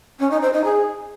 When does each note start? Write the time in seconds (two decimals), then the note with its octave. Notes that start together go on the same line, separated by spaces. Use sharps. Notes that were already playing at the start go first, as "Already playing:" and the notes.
0.20 C#4
0.31 D#4
0.42 C5
0.53 D#4
0.64 G#4